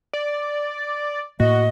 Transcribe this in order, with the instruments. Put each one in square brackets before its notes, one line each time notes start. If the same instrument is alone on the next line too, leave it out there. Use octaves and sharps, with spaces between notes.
[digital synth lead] D5
[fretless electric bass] A2 A#3 [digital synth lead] F#4 [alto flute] D#5